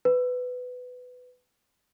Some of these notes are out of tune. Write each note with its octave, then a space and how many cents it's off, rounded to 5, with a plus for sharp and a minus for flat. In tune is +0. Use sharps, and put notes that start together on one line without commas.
B4 +15